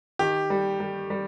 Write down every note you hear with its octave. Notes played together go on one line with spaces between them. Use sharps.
D#3 G4
G3
G3
G3